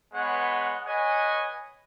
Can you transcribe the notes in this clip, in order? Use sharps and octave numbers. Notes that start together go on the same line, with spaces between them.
G#3 B3 B4 C#5 F#5
B4 C#5 D#5 F#5 G#5